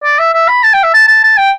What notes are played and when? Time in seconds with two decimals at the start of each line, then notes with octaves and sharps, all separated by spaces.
0.04 D5
0.19 E5
0.34 E5
0.48 B5
0.63 A5
0.73 G5
0.83 E5
0.94 A5
1.08 A5
1.24 A5
1.37 G5